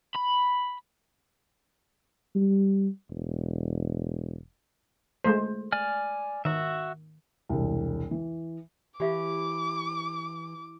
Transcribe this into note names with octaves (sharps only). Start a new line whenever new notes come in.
B5
G3
E1
G#3 A3 C5
D5 G#5 F6
D#3 F#4 E5
E1 C2
E3
E3 G4 E5 F5 D6